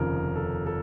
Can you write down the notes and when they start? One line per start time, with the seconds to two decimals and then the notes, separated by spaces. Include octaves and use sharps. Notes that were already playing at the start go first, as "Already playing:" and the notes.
Already playing: F1 D#2 C#3 F3 A#4
0.36 A4
0.66 A4